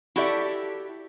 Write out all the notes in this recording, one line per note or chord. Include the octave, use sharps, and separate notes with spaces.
E4 F#4 G4 A4 D5 E5